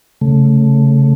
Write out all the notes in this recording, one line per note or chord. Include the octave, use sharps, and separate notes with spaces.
C#3 A3